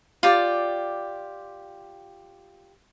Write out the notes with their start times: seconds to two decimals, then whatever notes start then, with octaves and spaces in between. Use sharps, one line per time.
0.23 F4 G4 D5